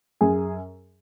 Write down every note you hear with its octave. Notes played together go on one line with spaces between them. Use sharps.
F#2 G#4 G#5